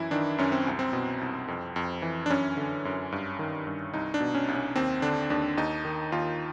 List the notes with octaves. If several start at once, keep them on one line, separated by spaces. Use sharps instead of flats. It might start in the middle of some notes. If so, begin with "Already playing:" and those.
Already playing: F#2 E3 E4
D#3 D4
F#2 C#4
C4
C2
C4
B2
C2
F2
F2
E3
D4
F#2 C#4
D3
F#2
G2
D#3
G2
C2 D#4
D4
B2
C#4
C2
C#4
D#2 C4
D3 D4
D#2 D4
D#2 D#4
D#3
D#2 F4